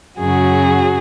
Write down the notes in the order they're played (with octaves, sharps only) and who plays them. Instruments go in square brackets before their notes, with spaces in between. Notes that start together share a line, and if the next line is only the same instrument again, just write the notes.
[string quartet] F#2 C#3 F#3 F#4 G#4